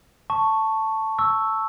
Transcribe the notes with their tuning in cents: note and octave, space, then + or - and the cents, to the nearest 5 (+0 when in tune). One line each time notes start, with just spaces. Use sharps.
A5 +5 C#6 +0
C#6 +0 E6 +0